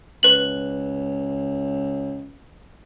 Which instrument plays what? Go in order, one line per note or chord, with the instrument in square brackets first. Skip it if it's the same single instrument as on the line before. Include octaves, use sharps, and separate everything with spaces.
[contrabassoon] C#2 [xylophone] B4 F#7